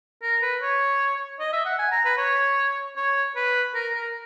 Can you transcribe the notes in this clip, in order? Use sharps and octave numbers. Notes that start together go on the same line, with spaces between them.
A#4
B4
C#5
D#5
E5
F#5
G#5
A#5
B4
C#5
C#5
B4
A#4
A#4